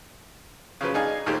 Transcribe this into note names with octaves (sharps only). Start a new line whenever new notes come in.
C#3 F3 F#3 B4
D4 D#4 G#4 F5 G#5
D#2 A#2 D#3 A3 G4 C5